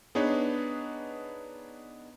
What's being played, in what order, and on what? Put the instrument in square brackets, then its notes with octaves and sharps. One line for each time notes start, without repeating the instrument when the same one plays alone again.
[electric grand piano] B3 D4 D#4 G#4 B4 C#5